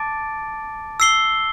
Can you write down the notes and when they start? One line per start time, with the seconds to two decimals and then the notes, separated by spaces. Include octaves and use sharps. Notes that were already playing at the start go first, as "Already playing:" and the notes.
Already playing: A5 D6 A6 D7
1.00 E6 C7 G7